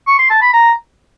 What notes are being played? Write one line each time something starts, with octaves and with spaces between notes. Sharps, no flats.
C#6
C6
A5
B5
A#5